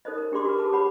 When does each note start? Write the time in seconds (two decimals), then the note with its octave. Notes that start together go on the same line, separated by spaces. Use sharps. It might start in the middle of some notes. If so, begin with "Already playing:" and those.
0.05 D#4 A4 A#4 C5 C#5 D#5
0.18 A#4
0.32 D4 G4 G#4 D5 C6 D6
0.45 F#4 A#4 B4
0.59 G4 A4 B4 A5 D6
0.73 G#4 C#5 F#5 B5